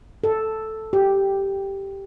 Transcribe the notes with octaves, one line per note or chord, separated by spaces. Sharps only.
A4
G4